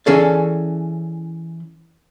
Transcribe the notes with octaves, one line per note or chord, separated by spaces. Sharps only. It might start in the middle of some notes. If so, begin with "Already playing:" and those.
E3 C#4 G#4 A4 D5